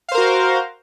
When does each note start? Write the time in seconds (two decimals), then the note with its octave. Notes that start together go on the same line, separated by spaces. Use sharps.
0.09 F5
0.12 C5
0.15 A#4
0.18 F#4